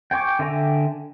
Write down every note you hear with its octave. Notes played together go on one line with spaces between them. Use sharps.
G5 G#5 C#6 D6
D3 E5 G5 G#5 A#5